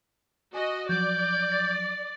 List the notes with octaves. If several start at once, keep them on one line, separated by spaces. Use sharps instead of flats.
F#4 D#5 G#5
F3 F#3 D5 G6
A6